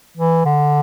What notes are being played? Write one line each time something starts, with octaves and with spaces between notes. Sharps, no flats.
E3
D3